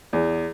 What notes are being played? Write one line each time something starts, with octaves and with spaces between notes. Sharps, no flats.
E2